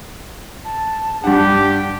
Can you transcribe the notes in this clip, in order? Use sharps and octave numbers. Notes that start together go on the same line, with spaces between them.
A5
G2 D4 G4 F#5